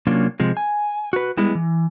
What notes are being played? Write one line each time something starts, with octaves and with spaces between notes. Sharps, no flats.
C3 F#3 A#3 C#4 D4 F4
C3 F3 G#3
G#5
F#4 B4
G3 G#3 B3 E4
E3